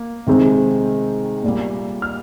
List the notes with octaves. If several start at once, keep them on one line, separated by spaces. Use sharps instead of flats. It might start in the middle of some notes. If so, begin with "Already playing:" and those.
Already playing: A#3
C3 D#3 G#3 C4
A#2 G3 A#3
F6